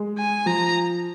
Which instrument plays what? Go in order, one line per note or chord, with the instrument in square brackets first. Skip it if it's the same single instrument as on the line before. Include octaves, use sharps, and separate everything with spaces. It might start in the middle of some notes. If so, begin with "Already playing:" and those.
Already playing: [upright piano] G#3
[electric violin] G#5
[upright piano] F3 [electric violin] A#5